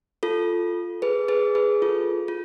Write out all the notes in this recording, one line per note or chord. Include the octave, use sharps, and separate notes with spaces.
F4 A4
G#4 B4
G#4 B4
G#4 B4
F4 A4
F4